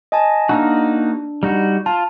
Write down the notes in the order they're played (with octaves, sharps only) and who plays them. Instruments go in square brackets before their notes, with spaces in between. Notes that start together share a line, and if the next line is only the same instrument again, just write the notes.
[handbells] D#5 G#5 A5
[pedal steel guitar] A#3 D#4 F#4 [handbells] D4
[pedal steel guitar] G3 D#4 F#4
[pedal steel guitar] F4 [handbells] A5